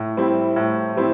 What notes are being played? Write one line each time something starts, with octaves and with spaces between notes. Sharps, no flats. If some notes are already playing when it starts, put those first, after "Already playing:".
Already playing: A2
G3 C4 E4
A2
G3 C4 E4